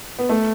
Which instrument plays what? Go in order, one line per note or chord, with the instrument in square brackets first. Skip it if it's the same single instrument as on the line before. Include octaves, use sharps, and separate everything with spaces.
[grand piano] B3
A3